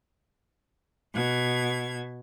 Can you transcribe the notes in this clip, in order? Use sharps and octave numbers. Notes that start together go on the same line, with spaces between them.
B2 G#6